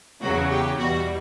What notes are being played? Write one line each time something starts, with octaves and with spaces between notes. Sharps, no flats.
E2 C#3 F#3 F#4
G4
E2 B2 G3 F#4